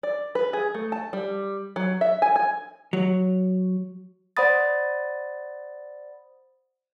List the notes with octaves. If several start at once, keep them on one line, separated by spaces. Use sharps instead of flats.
D5
B4
G#4
A3
A5
G3
F#3
E5
G#5
G#5
F#3
C5 D5 F#5 B5 D#6 A6